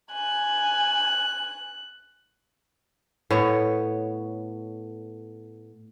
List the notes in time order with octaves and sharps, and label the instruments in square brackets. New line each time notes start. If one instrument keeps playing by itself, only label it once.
[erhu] G#5 [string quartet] F#6
[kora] A2 B3 C#5